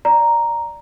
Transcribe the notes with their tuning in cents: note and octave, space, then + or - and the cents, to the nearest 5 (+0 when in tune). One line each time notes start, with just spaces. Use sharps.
D5 +0 A#5 +0